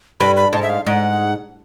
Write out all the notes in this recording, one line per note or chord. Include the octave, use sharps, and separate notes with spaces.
G2 B5
B5
G#2 A5
E5
F5
G#2 F#5